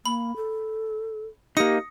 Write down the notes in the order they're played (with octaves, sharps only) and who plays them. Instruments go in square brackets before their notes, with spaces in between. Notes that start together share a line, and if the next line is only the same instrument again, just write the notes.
[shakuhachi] A#3 [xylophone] B5
[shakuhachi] A4
[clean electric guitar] A#3 D#4 [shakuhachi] G4 [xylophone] D#6 A#6 C#7